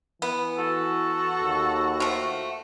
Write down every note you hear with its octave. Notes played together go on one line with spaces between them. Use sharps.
E3 B3
F#4 A4
D#2
F3 A3